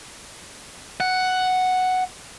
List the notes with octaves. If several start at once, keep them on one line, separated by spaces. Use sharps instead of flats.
F#5